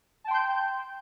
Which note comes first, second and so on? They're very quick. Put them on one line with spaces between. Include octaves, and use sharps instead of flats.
A5 G5 C6 G6